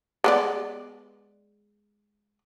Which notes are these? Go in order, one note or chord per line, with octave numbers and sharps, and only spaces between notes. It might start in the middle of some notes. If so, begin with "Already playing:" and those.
G#3 B3 D5